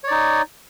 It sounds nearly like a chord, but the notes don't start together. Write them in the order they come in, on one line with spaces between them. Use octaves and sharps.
C#5 D5 D#4